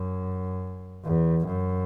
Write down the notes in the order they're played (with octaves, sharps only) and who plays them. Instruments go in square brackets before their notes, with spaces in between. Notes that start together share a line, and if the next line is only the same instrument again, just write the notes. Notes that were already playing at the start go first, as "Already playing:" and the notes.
Already playing: [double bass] F#2
E2
F#2